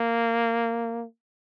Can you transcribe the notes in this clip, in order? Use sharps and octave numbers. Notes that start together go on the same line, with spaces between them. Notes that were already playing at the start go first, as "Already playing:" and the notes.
Already playing: A#3